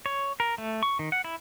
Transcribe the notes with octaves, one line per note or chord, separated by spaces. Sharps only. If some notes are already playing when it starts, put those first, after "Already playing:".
C#5
A#4
A3
C#6
D#3
F#5
E4